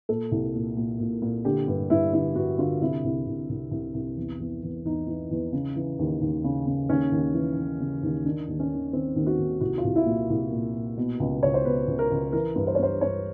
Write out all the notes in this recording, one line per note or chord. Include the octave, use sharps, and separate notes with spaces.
A#2 A4
C2
A#2
A#2
A#2
A#2
D3 G4
G2
G2 E4
D3 E4
G2 F#4
D3 F4
C3 E4
C2
C2
C2
C2
C2
E2
E2
E2
E2 D#4
E3
E2
C#3
E3
D#2
D#2
C#3
C#3
D#2 C#4
D#2
E3
E3
C#3
D#2
D#3 D4
D#2
C#4
D#3
D#3 C4
D#2
F#4
D#2
C2 F#4
F4
C2
E4
A#2
C2
A#2
A#2
B2
C#2
C#2 C#5
C5
B2 B4
C#2
A#4
C#2
E3 A#4
G2
C5
C#5
G2 C5
G2 C#5